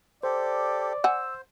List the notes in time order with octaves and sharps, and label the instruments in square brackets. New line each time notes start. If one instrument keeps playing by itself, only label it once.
[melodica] G4 A4 [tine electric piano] C5 [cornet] D5
[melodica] C5 [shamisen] F#5 G#5 [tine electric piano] E6